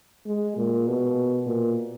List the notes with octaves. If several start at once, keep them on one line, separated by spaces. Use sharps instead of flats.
G#3
A#2
B2
A#2